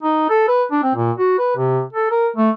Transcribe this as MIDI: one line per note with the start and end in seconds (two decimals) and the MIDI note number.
0.03 0.27 63
0.30 0.46 69
0.48 0.64 71
0.71 0.83 62
0.83 0.92 60
0.95 1.12 46
1.18 1.37 66
1.38 1.54 71
1.57 1.82 48
1.93 2.11 69
2.11 2.28 70
2.36 2.50 57